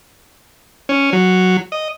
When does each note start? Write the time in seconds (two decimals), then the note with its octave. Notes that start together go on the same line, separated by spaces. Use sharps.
0.89 C#4
1.13 F#3
1.72 D#5